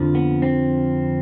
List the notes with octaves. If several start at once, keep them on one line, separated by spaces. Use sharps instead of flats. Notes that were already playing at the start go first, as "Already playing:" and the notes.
Already playing: F2 D3 F3
B3
C4